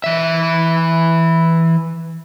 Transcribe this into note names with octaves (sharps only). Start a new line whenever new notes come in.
E3 E5